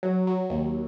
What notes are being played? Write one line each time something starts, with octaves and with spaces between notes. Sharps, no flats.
F#3
F#3
D#2